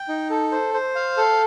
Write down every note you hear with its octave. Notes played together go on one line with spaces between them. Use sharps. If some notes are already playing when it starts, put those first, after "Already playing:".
Already playing: G5
D#4
A4
C5
C5
F5
A4